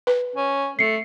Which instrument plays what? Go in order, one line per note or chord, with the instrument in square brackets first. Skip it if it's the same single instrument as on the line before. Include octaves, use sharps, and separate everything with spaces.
[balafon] B4
[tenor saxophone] C#4
[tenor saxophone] A3 [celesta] C7 C#7